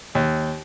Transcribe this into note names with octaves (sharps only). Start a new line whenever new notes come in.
D#2